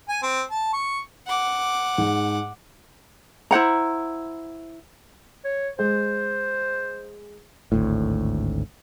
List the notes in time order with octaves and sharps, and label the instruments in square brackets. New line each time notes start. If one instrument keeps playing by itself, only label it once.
[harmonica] G#5
C4
A5
C#6
[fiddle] F#5 D6
[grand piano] G#2
[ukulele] E4 C5 F#5 A#5
[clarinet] C#5
[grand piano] G#3 [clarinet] C5
[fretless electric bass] G#1 D2 A2